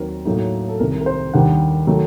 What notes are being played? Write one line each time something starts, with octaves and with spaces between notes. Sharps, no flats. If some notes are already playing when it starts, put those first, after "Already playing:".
Already playing: D#2 D#3 F#3 C4 A#4
A2 F#3 A#3 D#4
A4
C2 C3 D#3 A#4
A#4
C5
D#2 D#3 G3 D4 F#5
D#3 F#3 A3